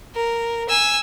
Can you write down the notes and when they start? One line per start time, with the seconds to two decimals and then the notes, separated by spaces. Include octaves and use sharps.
0.15 A#4
0.69 G#5 E6